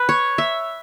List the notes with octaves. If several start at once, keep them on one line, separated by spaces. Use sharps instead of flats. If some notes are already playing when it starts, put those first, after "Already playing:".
Already playing: B4
C#5
E5